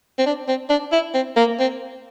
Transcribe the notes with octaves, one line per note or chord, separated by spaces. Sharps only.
C4
D4
C4
D4
E4
C4
A#3
C4